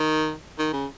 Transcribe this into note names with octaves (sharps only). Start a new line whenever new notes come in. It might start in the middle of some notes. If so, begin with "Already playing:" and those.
Already playing: D#3
D#3
C#3